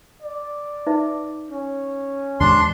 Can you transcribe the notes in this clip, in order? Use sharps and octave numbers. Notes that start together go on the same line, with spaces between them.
D5
D#4 B4 E5
C#4
D#2 G#2 E3 D4 C6